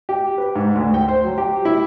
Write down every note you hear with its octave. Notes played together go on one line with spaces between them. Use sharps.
G4
B4
G#2
D2
G5
C5
F#3
G4
E4